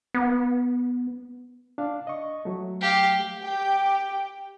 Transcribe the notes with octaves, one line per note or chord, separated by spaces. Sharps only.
B3
D4 F5
D#5 C#6
F#3 A3
G4 F5
G4 G5